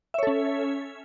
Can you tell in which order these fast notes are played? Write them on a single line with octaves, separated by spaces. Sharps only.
E5 C#5 A4 C#4